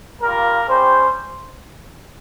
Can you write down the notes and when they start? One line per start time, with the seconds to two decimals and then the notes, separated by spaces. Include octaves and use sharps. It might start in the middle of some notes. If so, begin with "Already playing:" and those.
0.21 G3 A#3 F4 A#4
0.68 G3 C#4 G4 C5